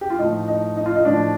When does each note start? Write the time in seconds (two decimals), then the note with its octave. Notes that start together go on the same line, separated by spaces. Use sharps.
0.01 G4
0.10 F4
0.19 A2 F3 D#4
0.48 D#4
0.77 D#4
0.86 F4
0.95 D#4
1.05 A2 F3 D4